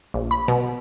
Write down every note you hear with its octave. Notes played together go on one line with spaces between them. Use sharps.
A#1
B5
B2